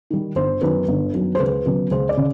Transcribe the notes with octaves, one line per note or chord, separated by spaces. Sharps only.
D#3 G3
G1 C5
F#2 D#3 F#3 B3 B4
G1
F#2 D#3 F#3 B3
C5
C#2 B4
C#3 F#3 B3
C#2 C5
D5
C#3